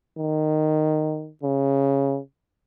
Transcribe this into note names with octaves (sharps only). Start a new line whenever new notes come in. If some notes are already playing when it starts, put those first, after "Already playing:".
D#3
C#3